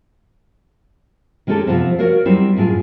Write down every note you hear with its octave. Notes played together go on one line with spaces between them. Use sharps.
D#3 G#3 C#4 G4 A4
C3 F3 B3 C4
F#4 A#4 C#5 F5
F#3 G3 C4 E4
F#2 A2 F4 G4 G#4